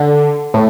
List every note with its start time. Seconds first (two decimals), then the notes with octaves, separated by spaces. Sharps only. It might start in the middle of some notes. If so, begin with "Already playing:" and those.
Already playing: D3
0.54 A2